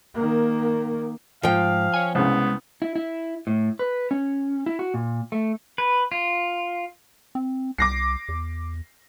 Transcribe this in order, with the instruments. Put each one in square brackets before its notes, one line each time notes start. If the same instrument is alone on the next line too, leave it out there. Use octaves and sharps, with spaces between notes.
[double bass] D#3 A#3
[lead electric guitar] D#2 G#2 [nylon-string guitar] F3 G5 [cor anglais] F5
[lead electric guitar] C#5 G#5
[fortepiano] C2 C#3 [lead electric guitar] G#3 [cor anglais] B3
[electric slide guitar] E4
E4
A2
B4
C#4
E4
F#4
A#2
A3
[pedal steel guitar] B4
F4
[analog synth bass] C4
[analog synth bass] C2 [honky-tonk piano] D6 A#6 C7
[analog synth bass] E2